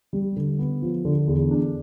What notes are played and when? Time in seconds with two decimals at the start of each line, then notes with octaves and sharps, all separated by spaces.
0.13 G3
0.36 D3
0.59 B3
0.82 F3
1.05 D3
1.28 E2
1.51 D4